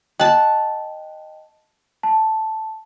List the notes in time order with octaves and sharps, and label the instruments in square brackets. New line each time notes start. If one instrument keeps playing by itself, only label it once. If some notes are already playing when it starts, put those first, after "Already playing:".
[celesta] D#5 G5 [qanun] F#5 A5
[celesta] A5